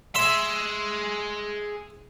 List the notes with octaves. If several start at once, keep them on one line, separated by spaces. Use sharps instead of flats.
G#4 E5 C6